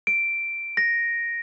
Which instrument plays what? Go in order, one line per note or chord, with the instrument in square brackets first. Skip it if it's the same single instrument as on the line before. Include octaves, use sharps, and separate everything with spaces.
[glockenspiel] D7
A#6